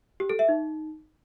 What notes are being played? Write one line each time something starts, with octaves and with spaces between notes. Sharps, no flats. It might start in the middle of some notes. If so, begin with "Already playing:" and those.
G4
A4
E5
D#4